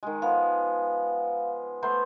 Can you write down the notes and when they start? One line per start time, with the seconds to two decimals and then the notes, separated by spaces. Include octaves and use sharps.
0.03 D#3 G#3
0.22 F3 B3 F5
1.83 A3 B3 C5